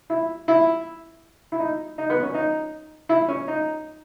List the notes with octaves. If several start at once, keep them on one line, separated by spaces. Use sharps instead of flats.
E4
E4
E4
D#4
D#4
B3
C#4
D#4
E4
C#4
D#4